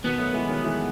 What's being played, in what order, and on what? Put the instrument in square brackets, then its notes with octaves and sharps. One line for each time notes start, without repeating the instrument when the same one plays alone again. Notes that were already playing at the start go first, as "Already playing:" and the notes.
[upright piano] B2 D#3 [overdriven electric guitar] B3
[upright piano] F#3 A3
E3 G#3
D#3 F#3
E3 G#3